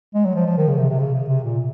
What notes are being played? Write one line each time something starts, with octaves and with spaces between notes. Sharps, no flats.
G#3
F#3
F3
F3
D#3
C#3
C3
C3
C#3
C#3
C3
A#2